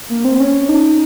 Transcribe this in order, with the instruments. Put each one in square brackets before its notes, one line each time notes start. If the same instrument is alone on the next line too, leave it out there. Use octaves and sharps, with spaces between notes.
[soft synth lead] A#3
C4
C#4
D#4